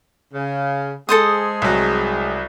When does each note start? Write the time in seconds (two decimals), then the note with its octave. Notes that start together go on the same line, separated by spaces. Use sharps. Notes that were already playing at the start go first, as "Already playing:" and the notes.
0.34 C#3
1.09 G#3 G#4 A4 C5 D#6
1.62 C2 F#3